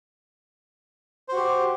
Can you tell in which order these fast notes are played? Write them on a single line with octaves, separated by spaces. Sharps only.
C5 F#4 G4